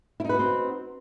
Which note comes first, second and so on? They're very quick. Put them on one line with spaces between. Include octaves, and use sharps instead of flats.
E4 D#4 B4 F#4 C4